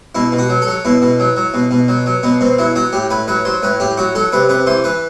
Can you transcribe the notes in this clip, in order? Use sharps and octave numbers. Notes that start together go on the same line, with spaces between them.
B2 E4
B2
F#4
F#3
A4
F#3
B2 E4
B2
F#3
F#3
B2
B2
F#3
F#3
B2 B3
B2 C4
F#3 E4
F#3 F#4
A2 G4
A2 B4
F#3 B4
F#3 C5
A2 B4
A2 G4
F#3 F#4
F#3 A4
C3 B4
C3 B4
E3 C5
E3 B4